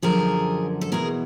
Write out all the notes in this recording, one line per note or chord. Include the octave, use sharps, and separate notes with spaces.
F#2 D3 F3 G#4 A#4
A4
E2 B2 G#4 A#4